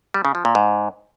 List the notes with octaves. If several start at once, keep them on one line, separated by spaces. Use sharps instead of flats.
G3
C#3
F3
A#2
G#2